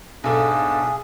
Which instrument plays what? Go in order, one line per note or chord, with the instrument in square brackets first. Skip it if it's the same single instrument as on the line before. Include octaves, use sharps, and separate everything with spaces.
[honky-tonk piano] B1 A4 [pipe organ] G#2 D4 D#4 [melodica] G#4